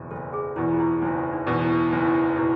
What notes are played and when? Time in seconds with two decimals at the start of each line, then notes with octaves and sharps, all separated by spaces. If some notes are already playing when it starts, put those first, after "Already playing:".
Already playing: F#1 E2 B2
0.11 F#1 A4
0.33 G#4
0.56 E2 B2 E4
0.72 F4
0.80 E4
1.02 F#1 D#4
1.33 D#4
1.47 E2 B2
1.53 D#4
1.63 E4
1.92 F#1 D#4
2.01 E4
2.08 D#4
2.38 B2 E4